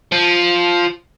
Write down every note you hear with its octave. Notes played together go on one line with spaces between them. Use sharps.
F3